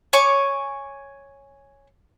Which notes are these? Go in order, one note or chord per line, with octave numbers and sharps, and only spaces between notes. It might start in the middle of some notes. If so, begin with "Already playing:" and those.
C#5 G#5 C#6 D6